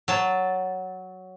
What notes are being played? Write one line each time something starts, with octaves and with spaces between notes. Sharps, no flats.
F#3 A5